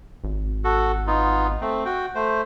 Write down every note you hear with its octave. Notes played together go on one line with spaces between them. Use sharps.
G#1
F#4 A4
B3 D#4 F4
A3 C4
F#4 G5
A3 C5